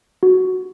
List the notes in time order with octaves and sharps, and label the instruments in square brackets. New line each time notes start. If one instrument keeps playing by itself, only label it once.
[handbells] F#4